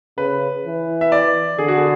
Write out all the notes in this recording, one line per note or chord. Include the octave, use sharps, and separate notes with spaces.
C#3 B4
E3
E5
D5
D3 G#4
F#4
G#4